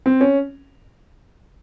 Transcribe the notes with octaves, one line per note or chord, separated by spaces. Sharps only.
C4
C#4